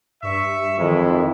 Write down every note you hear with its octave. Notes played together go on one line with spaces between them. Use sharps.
G2 E5 C#6
F2 D#3 E3 G#3 E4